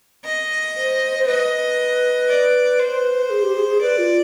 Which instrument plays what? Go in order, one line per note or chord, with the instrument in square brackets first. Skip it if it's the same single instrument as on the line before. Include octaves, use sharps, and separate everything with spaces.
[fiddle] D#5
[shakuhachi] C5
C5
[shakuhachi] B4 [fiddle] D#5
[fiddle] D5
C5
[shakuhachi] G#4
G4
G#4
G#4
[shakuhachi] B4 [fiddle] D5
[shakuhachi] F4